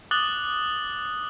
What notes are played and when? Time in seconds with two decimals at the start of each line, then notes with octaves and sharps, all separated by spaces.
0.11 D6 D#6 F#6 A6 F#7 G7